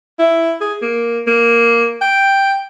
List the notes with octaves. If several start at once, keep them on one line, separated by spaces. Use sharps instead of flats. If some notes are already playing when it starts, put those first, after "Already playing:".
E4
G#4
A#3
A#3
G5